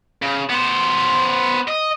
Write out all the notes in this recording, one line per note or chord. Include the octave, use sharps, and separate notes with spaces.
C#3
B3 C5
D#5